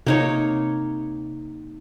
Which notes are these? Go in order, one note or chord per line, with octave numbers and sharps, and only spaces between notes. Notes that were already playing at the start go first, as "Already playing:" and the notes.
C3 A#3 D#4 C#5